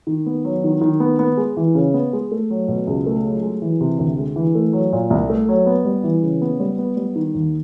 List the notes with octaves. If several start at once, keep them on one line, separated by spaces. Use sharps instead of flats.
D#3
B3
F#3
D#3
D#3
B3
B3
G#3
E3
C#3
B3
G#3
A3
F#3
B2
C#2
A3
F#3
G#3
E3
C3
D2
G#3
E3
A3
F#3
A#2
C2
A3
F#3
B3
G3
E3
C#3
B3
G3
B3
G3
D#3
D#2